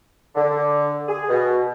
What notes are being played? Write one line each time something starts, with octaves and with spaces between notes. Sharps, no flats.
D3
G#4
B2